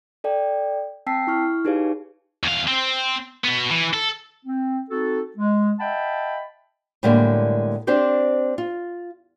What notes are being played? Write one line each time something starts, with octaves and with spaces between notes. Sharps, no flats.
A4 D5 G5
C4 G5 A5 E6 B6 C7
E4 C#6 F6
D#4 G4 G#4 B4 C#5 F5
E2 F5
C4
B2 B3
E3
A4
C4
C4 D#4 F#4 A4
G#3
D#5 E5 F#5 G5 A5 B5
A2 D3 G3 G#3 A#3
C4 D4 G4 C5 D5
F4